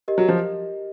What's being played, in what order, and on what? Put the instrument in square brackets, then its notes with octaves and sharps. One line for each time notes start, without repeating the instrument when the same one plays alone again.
[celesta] G4 A#4 D#5
[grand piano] F#3
F3